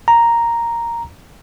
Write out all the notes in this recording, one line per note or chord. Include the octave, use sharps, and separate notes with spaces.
A#5